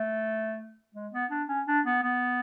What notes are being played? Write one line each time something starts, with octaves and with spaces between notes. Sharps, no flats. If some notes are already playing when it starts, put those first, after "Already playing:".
Already playing: A3
G#3
B3
D4
C#4
D4
B3
B3